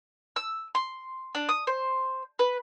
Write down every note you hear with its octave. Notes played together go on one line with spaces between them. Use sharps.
E6
C6
D4
D#6
C5
B4